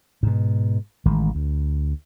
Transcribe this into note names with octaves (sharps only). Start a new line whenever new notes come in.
G#2 B2
A1 D#3 G#3
D2